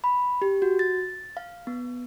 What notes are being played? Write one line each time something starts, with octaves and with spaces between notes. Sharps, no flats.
B5
G4
F#4
A6
F5
B3